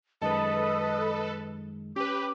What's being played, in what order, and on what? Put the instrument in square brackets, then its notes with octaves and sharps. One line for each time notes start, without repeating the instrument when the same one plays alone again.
[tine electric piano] F#2 D#3 G#3 [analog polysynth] A4 B4 [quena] D#5
[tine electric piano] C#4 [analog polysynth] G4 B4 [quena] D6